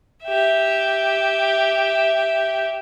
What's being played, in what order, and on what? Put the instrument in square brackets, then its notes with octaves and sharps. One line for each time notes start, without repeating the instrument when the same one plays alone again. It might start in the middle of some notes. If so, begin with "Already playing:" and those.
[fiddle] G4 E5